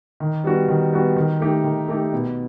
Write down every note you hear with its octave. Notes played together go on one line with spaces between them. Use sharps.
D#3
G3 B3 F#4
D#3
G3 B3 F#4
D#3
A3 D#4 G4
D#3
A3 D#4 G4
B2